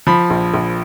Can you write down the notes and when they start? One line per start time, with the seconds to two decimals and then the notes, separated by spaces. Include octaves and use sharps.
0.07 F3 B5
0.30 A#1
0.54 A#1